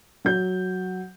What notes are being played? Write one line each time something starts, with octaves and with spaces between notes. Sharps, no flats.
F#3 G6